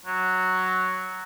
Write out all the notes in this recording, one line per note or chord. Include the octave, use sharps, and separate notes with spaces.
F#3